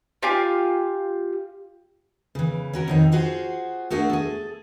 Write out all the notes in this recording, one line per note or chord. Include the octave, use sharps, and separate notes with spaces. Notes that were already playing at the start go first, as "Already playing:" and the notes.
F4 G4 F5 G#5
C#3 E3
C#4 F#4 A#4
F2 D#3 D#4
F4 F#4 G#4 C5
A3 A#3 D4 F#4 G#4 A#4
G#4 A4